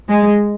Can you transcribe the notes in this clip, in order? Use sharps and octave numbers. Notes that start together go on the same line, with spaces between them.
G#3